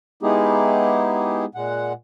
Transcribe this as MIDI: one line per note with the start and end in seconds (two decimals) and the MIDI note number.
0.23 1.45 56
0.23 1.45 59
0.23 1.45 63
0.23 1.45 64
0.23 1.45 67
0.23 1.45 68
1.55 1.93 46
1.55 1.93 56
1.55 1.93 78